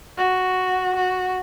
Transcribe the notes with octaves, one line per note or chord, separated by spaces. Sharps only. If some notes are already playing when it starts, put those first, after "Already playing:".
F#4
F#4